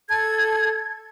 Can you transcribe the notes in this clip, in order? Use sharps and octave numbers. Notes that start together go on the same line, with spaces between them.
A4 G#6